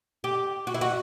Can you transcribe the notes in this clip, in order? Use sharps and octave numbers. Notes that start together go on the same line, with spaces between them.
G4
F#4
E4
F#4